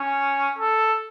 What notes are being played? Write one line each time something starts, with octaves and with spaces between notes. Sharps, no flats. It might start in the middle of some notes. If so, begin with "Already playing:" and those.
Already playing: C#4
A4